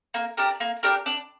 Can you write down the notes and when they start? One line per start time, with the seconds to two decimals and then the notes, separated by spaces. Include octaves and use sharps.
0.14 A#3
0.37 D4 G4 A#4
0.60 A#3
0.83 D4 G4 A#4
1.06 D4